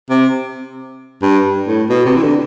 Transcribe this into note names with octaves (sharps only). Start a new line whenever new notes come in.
C3
G2
A2
B2
C3
E3
D3